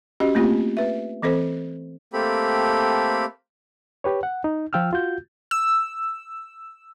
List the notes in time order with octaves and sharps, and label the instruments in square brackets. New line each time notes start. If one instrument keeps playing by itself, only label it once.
[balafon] C#4 F#4 G4 D#5
A3 A#3 C4 F4 G4
B4 E5
E3 C4 A4 C5
[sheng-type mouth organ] A3 A#3 C4 G4 A4 B5
[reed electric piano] G4 B4 C#5
F#5
D#4
F3 F4 G5 E6 F6
F4 F#4 G6
[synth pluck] E6